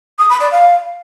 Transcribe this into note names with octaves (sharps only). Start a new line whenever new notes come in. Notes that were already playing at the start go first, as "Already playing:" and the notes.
D#6
B5
D5
F5